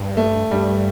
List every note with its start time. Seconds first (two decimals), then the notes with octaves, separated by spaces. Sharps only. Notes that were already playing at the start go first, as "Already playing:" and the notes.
Already playing: G2
0.17 A3
0.51 G2 G3